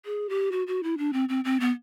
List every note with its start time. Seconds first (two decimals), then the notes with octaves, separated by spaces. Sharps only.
0.05 G#4
0.29 G4
0.52 F#4
0.67 F#4
0.83 E4
0.98 D4
1.13 C4
1.29 C4
1.45 C4
1.60 B3